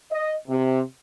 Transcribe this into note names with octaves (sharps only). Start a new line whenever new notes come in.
D#5
C3